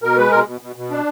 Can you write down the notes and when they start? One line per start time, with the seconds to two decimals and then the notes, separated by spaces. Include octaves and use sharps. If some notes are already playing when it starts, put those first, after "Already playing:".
0.02 B2 A#4
0.17 G#3 B4
0.31 B2 A#4
0.46 B2
0.61 B2
0.76 B2
0.91 D4